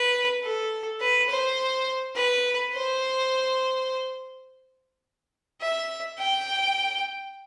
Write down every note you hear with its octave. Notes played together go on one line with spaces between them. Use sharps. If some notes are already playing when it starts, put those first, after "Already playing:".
Already playing: B4
A4
B4
C5
B4
C5
E5
G5